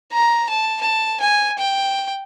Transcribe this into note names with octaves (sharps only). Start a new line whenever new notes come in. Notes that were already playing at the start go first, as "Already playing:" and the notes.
A#5
A5
A5
G#5
G5